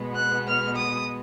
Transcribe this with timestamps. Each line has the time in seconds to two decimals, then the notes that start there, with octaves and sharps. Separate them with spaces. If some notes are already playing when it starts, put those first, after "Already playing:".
Already playing: B2 G#3 B3
0.15 F#6
0.47 F6
0.77 D#6